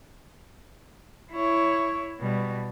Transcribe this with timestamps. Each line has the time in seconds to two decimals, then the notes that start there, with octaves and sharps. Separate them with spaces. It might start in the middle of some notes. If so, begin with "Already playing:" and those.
1.31 E4 C#5
2.20 B2 G3